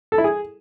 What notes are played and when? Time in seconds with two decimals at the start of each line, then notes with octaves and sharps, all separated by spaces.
0.12 A4
0.18 E4
0.24 G#4